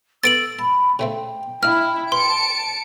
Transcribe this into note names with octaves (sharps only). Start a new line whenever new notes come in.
B3 A4 D6 E6 A6 D7 F#7
A5 B5
C#3 A3 C4 G5
A#3 D4 E4 F6
B4 A5 C6 C#7 D7